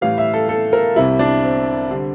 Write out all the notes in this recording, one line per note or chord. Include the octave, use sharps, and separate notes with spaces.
A2 E3 G3 F5
E5
A4
A4
A#4
C2 C3 G3 E4
D4
C4
D3 G3